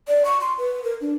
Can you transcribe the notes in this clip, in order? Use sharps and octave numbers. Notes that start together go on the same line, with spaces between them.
D5
C#6
C6
B4
A#4
D4